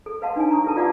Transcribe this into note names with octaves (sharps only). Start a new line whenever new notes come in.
A4
B4 D#5 F5 F#5 A5 C6
D4 D#4 C#5 G#5
A#5 C#6 D#6
E4 G4 A4 B4 G#5 A5
F4 D5 E5 F#5 C6 D6